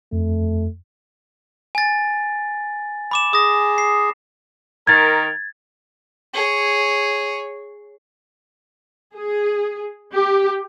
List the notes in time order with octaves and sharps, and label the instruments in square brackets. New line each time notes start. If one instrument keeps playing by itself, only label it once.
[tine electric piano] F2 [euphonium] A3
[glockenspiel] G#5 A6
B5 D6 E7
[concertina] G#4 [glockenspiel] D#6 A#6
[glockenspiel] C7
[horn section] D#3 A#4 [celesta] G#6 A6
[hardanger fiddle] G#4 C#5
[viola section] G#4
G4